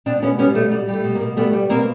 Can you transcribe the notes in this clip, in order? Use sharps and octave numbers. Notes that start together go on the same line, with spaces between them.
B2 C4 D4
B2 B3 C#4
G3 B3 C#4
B2 A3
G3
G3
A3
B2
A#3
B2
G3 A3 B3
G3
B2 A#3 C4